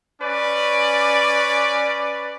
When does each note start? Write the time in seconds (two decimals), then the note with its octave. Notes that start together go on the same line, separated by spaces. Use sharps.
0.22 C#4 B4 D5